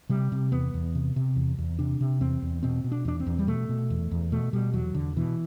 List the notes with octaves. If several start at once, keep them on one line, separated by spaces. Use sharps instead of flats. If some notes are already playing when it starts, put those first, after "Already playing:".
C3 G3
C3
E2 B3
E2
C3
C3
E2
E2
C3 D4
C3
E2 C4
E2
B2 C4
B2
D4
E2 D4
C4
E2
G3
B2 A3
B2
E2
E2
B2 A3
B2 G3
E2 F#3
E2 D3
B2 E3